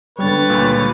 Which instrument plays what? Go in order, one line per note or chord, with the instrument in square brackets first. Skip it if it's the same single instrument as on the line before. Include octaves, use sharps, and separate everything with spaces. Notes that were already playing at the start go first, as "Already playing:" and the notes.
[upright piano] D3 G3 [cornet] B4 [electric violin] C#5 A6
[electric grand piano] C#2 A#2